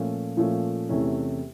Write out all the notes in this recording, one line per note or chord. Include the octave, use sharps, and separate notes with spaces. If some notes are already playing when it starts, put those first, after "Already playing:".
Already playing: A#2 F3 A3 C#4 F4
A#2 F3 A3 C#4 F4
E2 C3 E3 A3 C#4